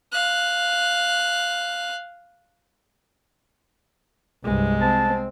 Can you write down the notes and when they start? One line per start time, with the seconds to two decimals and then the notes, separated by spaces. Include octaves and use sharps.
0.12 F5 F#6
4.45 C2 G2 G#3
4.81 C4 A5